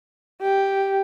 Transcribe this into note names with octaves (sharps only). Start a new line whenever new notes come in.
G4